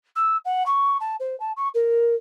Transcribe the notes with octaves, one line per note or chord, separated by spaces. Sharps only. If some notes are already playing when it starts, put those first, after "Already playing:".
E6
F#5
C#6
A5
C5
A5
C#6
A#4